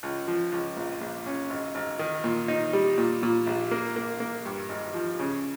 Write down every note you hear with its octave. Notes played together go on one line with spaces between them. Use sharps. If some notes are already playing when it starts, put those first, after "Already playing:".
C#2
F3
C#2
A#1
A#1
C#4
G#1
G#1
D#3
A#2
D#4
G3
A#2
A#2
A#1
A#3
A#3
A#3
G2
G#1
F3
C#3